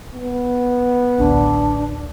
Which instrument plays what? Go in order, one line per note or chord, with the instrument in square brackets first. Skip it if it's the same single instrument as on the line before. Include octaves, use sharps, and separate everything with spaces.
[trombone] B3
[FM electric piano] A1 D2 A2 [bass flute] D4